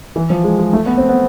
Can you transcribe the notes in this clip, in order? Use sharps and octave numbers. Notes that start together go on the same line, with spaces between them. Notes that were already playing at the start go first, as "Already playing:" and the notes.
E3
F3
G#3
G#3
A3
B3
C4
B3